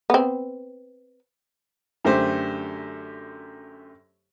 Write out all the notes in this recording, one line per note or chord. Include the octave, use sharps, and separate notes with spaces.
B3 C4
F#2 D3 A3 G4 C5